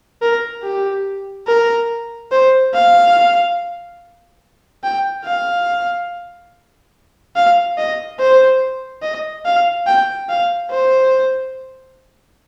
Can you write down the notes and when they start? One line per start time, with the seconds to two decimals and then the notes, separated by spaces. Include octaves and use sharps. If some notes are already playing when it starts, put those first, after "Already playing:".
0.22 A#4
0.63 G4
1.47 A#4
2.32 C5
2.74 F5
4.84 G5
5.25 F5
7.36 F5
7.78 D#5
8.20 C5
9.03 D#5
9.46 F5
9.87 G5
10.29 F5
10.71 C5